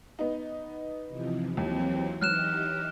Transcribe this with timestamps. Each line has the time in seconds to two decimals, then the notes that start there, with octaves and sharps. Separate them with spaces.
0.19 B3 D#4
1.07 C3 E3 F3
1.57 D#2 E3 F#3 C4
2.21 E3 F#3 D#4 G4 F6 F#6 E7